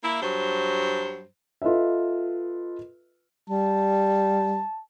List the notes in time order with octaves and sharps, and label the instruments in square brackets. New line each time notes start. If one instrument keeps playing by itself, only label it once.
[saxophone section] A#3 E4
G2 F#3 C5
[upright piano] F4 A4 B4 D#5 E5
[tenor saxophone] G3 [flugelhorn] A5